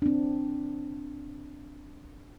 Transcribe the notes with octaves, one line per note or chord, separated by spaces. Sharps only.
C4 D4